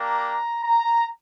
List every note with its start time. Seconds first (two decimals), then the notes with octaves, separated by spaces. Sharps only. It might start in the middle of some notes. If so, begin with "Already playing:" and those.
Already playing: A#3 D4 G4 A#5
0.63 A#5